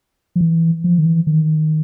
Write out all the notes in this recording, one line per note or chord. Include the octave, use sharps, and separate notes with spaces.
F3
E3
F3
D#3
E3
D#3